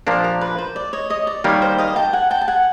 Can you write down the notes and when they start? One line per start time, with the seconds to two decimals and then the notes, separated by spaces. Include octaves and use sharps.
0.07 A#2 F3 A#3 D4 A#4
0.24 A#4
0.41 B4
0.58 C5
0.76 D5
0.93 C#5 D#5
1.10 C#5 D#5
1.27 D5
1.44 D#3 G3 A#3 C#5
1.62 C5
1.78 D#5 F5
1.96 G5 A5
2.13 F#5 G#5
2.31 G5 A5
2.41 A5
2.48 F#5 G#5